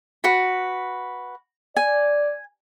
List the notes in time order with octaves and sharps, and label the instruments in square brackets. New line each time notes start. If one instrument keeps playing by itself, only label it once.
[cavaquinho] F#4 B4 B5
[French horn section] D5 [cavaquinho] G#5